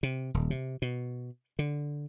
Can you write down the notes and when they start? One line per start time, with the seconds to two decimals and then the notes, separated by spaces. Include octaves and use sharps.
0.03 C3
0.34 D#1
0.50 C3
0.82 B2
1.59 D3